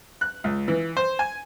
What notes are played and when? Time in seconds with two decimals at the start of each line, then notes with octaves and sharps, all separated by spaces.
0.21 F#6
0.44 C#2
0.68 E3
0.97 C5
1.19 G#5